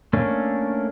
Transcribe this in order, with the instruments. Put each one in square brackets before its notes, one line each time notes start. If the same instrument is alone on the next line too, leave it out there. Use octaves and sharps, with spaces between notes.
[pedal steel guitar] A3 A#3 C#4 D4